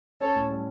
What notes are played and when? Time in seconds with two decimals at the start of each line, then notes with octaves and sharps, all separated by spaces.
0.21 C#4 A4 C#5
0.36 A2
0.50 G3